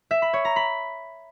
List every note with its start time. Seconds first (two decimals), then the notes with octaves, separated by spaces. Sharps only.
0.11 E5
0.22 B5
0.33 C#5
0.45 A#5
0.56 B5